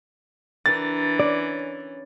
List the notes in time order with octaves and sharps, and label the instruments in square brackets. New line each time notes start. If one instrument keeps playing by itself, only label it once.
[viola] E3 [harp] D4 G4 A#4 [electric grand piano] A6
[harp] C#4 G#5 D6 [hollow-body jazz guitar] D5